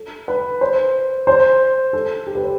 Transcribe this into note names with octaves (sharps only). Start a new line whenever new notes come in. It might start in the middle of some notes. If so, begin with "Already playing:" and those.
Already playing: A4
B4
C5
C5
A4
G4
B4
C5